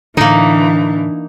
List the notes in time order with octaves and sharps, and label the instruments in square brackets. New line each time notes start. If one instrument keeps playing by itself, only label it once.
[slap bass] A2 D3 [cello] E3 D4 [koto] A#3 D#4